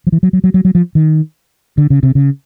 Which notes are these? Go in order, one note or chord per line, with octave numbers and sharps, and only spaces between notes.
F3
E3
F#3
F#3
F#3
F#3
F#3
F3
D#3
D3
C#3
C3
C#3